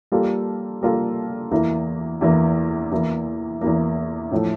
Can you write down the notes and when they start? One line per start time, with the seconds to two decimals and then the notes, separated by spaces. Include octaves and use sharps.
0.12 G3 A#3 F4 A4
0.82 G3 A#3 F4 A4
1.51 E2 E3 A#3
2.21 E2 E3 A#3
2.92 E2 E3 A#3
3.61 E2 E3 A#3
4.31 A2 F3 A3